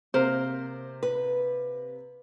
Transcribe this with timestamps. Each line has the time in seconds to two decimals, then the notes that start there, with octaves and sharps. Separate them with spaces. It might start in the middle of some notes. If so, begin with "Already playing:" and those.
0.14 C3 A#3 A#4 C5
1.03 B4